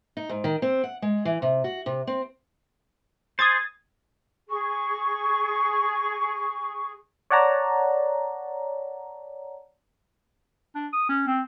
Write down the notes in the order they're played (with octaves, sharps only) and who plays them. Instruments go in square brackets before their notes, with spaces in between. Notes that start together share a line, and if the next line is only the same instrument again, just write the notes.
[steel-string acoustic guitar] D#4
G#2
D#3
C4
F#5
G#3
E3
C3
F#4
C3
C4
[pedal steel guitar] G#4 C5 [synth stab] D#6 G#6 A6
[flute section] G#4 C#6
[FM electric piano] C#5 D5 F#5 A5 A#5
[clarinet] D4
D#6
C#4
C4